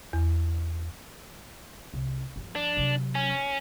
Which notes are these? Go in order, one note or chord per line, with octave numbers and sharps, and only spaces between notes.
E2
C2
G2 F3
D4
C3 F#3
C#4